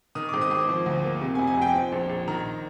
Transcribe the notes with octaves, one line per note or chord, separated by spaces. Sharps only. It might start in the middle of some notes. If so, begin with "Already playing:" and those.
D#3 D#6
D6
G#1
D#6
G#1 D6
F3
D2
A#3
C3
G#5
F1
G#5
F1 G5
F3
A#1
A#1
D#3 A#5